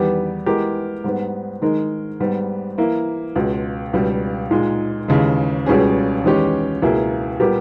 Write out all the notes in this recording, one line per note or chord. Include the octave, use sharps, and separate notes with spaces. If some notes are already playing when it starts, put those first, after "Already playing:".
Already playing: E2 D#3 G3 B3 G4
E3 G#3 B3 G4 A#4
G#2 G3 B3
D#3 G#3 D#4 A#4
G#2 G3 B3
E3 A#3 E4
C#2 B2 G#3
C#2 B2 G3
A#2 G#3 D#4
D#2 C#3 E3 G#3
C#2 B2 G3 C#4 G#4
E2 D#3 G#3 C#4 G4
C#2 B2 A#3 E4 G#4
A#2 G3 B3 G4 A#4